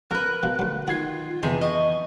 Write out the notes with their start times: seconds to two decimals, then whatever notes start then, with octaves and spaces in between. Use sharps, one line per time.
0.11 F2 A#4 B4 F6 F#6
0.43 B2 F3
0.59 D2 F#3
0.88 D#3 F4 F#4 G#6 C7
1.43 F2 C3 E3 B3 G#4 E5 C6
1.61 D#5 C#6